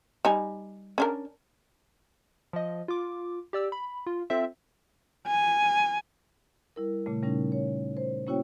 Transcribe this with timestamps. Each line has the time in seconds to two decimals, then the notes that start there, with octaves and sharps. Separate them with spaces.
0.25 G3 D#4 G#5
0.98 C#4 D4 A#4
2.53 F3 D#5
2.88 F4 D6
3.53 G4 D5 E6
3.72 B5
4.06 F4
4.30 C4 F4 A4 C5 E5
5.27 G#5
6.76 G3 E4 A#4
7.06 A#2 C#3 A3
7.23 C#3 G3 C#4 D#4
7.52 C#5
7.97 C5
8.27 A#3 C#4 E4 F#4 C#5 G5